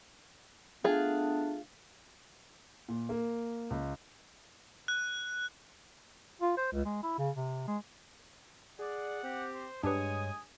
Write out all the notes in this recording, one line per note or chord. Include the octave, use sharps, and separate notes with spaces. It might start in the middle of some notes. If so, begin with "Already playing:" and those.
A3 B3 D4 F4 G#4
A#2
A#3
C#2
F#6
F4
C5
C#2
G#3
E4
C#3
C3
G#3
G#4 D5 F#5
C4 G4
C5
G2 G#3 D4 G4 B4 C#5 G#5 D#6